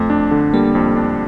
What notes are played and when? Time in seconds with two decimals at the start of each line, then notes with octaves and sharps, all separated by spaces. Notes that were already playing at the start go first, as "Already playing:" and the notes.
Already playing: F2 A3
0.10 D4
0.31 D3
0.54 G3 A#3
0.75 F2
0.96 D4